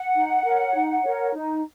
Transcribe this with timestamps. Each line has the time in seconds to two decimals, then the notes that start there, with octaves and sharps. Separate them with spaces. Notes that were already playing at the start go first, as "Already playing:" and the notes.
Already playing: F#5
0.15 D#4
0.44 A#4 C#5
0.75 D#4
1.04 A#4 C#5
1.33 D#4